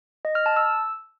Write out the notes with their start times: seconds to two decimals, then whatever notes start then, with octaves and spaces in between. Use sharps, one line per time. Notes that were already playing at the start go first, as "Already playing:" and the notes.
0.25 D#5
0.35 F6
0.46 A5
0.57 E6